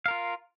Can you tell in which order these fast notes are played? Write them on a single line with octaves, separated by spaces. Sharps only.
F5 A#4 F4